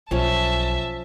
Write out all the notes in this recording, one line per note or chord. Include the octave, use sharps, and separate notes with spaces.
B1 F3 C#4 E5 A5